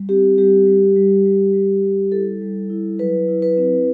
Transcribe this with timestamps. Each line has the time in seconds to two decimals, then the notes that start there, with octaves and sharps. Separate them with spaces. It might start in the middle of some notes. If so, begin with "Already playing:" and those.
Already playing: G3
0.09 C4 G4
0.38 G3 G4
0.66 G3
0.96 G3
1.25 G3
1.53 G3
1.83 G3
2.12 E4 A4
2.42 G3
2.70 E4
2.99 F#3 B4
3.28 E4
3.42 B4
3.57 C4